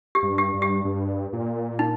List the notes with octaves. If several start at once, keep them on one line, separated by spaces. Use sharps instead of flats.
G4
G2
G4
G2
G4
G2
A#2
D#4